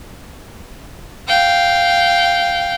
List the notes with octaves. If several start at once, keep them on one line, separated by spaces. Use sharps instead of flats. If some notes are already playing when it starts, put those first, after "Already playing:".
F5 G5